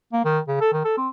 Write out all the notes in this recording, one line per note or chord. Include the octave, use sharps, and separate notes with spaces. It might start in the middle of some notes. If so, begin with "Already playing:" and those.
A#3
D#3
C#3
A4
D#3
A4
C4